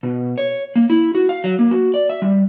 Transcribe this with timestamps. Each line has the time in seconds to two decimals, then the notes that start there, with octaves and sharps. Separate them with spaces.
0.03 B2
0.38 C#5
0.76 A#3
0.90 E4
1.15 F#4
1.29 F5
1.44 F#3
1.59 A#3
1.71 F#4
1.94 D5
2.09 E5
2.22 G3